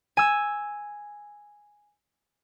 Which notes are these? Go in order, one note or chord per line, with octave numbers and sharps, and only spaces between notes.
G#5 E6